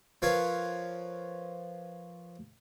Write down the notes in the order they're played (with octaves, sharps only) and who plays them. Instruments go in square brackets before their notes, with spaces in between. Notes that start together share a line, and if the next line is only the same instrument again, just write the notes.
[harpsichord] F3 A#4 B4 C#5 F5